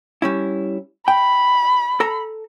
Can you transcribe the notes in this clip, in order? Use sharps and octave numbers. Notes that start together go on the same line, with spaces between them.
G3 C#4 E4
G5 B5
A4 A#5